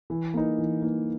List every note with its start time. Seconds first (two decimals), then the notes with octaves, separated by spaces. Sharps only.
0.10 E3
0.34 A#3 D#4
0.58 E3
0.82 A#3 D#4